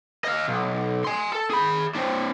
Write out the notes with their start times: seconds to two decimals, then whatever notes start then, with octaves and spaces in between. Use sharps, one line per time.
0.24 D#5 F5
0.48 B1
1.04 G#5 C6
1.33 A4
1.50 G#4 B5
1.95 C4 D4